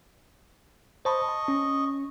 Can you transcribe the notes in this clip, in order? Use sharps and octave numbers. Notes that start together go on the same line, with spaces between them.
C5 D#5 A5 B5 C#6
A5
C#4